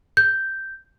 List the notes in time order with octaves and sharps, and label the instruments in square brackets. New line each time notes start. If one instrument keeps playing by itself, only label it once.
[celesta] G6